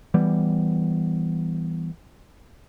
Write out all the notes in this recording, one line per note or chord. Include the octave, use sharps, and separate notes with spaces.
E3 G3 B3